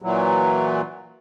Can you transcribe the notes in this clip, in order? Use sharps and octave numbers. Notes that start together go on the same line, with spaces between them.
A#2 E3 F#3